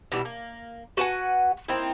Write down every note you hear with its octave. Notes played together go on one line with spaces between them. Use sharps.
B2 E3 G3
A#3
F#4 B4 F#5 G#5
A#3 C4 D#4 E4